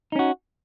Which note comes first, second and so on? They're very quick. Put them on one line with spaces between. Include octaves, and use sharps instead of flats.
D#4 C#4 F#4